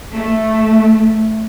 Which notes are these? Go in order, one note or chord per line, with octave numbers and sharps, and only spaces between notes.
A3